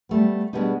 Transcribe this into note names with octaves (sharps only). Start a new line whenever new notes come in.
G3 A3 B3
B2 G3 G#3 B3 D4 D#4